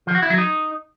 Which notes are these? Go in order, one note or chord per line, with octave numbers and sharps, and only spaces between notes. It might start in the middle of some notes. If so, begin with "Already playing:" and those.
F3
F#4
E4
F#3
D#4